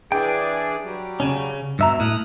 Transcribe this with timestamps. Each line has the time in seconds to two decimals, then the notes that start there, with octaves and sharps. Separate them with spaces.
0.12 E3 D4 G#4 G5
0.84 F#3 G3
1.20 C#3 C#4
1.79 G2 B2 E5 A#5
2.00 A2 D#6 F6 F#6